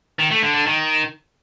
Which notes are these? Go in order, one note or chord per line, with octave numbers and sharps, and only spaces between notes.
D#3
A3
D3
D3
D#3